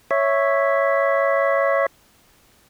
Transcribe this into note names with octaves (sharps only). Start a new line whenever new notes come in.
C#5 E5